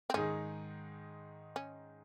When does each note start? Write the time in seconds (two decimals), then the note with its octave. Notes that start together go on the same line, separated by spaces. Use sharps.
0.10 C4
0.14 G#2 D#3 G#3 C#4 D#4 G#4
1.56 C#4